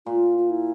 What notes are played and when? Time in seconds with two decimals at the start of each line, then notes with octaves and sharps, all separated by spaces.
0.06 A#2 F4
0.38 F4
0.50 E4